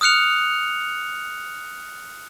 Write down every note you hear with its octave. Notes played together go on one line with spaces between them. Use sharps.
D#6 F6 F#6 C#7 F7